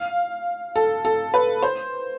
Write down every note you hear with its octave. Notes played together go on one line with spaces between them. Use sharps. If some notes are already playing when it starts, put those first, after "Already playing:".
Already playing: F5
A4
A4
B4
C5